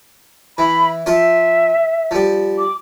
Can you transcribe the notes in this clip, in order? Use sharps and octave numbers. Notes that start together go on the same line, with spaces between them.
E3 B5
F3 F4 C5 E5
F3 G3
D6